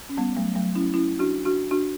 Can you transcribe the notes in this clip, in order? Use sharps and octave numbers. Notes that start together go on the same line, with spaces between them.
C#4
G3 B3
F#3 A3
F#3 A3
C#4 E4
C#4 E4
D4 F#4
D4 F#4
D4 F#4